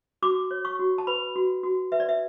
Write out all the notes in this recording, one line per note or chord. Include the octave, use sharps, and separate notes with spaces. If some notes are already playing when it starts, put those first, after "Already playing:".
F#4 D6
C#5
C#6
F#4
A5
B4 B5
F#4
F#4
B4 E5
D5
E5